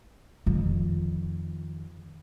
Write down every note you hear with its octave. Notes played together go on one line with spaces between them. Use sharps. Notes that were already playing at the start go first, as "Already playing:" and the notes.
F2 D#3